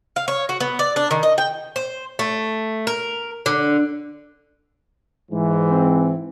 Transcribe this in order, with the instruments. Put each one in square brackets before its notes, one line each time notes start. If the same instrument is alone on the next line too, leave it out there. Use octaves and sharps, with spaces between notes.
[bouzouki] F5
C#5
F#4
B3
D5
D4
D#3
D#5
G5
C5
A3
A#4
D3
[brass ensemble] G#2 E3
[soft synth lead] C4